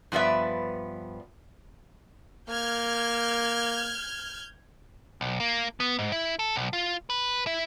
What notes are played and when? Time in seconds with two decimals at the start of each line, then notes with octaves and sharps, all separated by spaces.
0.12 G2 F3 B3 D5 E5
2.48 A#3 F6 G6 G#6
5.21 B1
5.40 A#3
5.80 B3
5.98 G#2
6.12 E4
6.39 A4
6.56 B1
6.73 F4
7.10 B4
7.47 E4